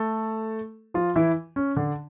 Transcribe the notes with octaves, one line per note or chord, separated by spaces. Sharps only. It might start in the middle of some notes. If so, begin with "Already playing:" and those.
Already playing: A3 A4
F3 F4
E3 E4
C#4
D3 D4